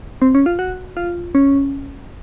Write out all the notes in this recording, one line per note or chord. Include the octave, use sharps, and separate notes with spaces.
C4
C#4
F4
F#4
F4
C#4